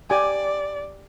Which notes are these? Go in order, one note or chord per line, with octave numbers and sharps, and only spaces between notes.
G4 D5 G#5